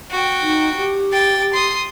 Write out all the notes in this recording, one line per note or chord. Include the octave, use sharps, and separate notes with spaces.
F#4 G5
D#4
G4
G5 A6
C6 D#6